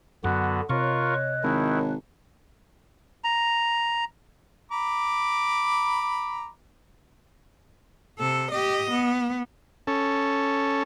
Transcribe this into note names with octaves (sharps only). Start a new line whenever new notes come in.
F#2 D3 B3 F#4
C3 F4 A#4 C#5 D#5 C#6 F#6
G#1 D#3 E4
A#5
A#5 B5 D6
C3 A4
G4 D#5
B3
C#4 A4